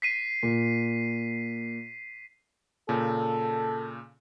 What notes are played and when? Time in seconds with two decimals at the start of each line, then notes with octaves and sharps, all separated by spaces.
0.02 B6 C7 D#7
0.43 A#2
2.89 A#2 C#3 A4